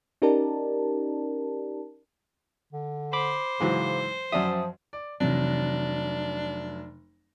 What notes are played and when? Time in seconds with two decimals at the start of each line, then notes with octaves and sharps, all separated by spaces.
0.22 C#4 D#4 G4 A#4 D5 A5
2.73 D3
3.13 C5 B5 D6
3.60 G#2 C#3 E3 F#3
4.32 F#2 F3 D5 E5 D#6
4.93 D5
5.21 F1 C3 E3 F#3 C4 D4